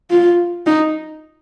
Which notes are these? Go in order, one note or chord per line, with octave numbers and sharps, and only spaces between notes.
F4
D#4